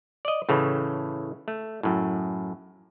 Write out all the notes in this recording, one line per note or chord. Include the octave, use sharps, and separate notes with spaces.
D5 D#5
A2 C#3 E3 A3
A3
F#2 A2